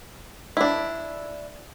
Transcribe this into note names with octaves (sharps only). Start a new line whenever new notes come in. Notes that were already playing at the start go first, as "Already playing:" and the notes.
D4 E4